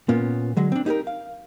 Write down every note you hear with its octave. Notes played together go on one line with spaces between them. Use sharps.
A#2 A#3 B3 C#4 F4
D3 F#3 G#3
C4 D4
D#4 G4 G#4 A#4
F5